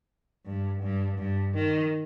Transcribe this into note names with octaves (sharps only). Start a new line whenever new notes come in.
G2
G2
G2
D#3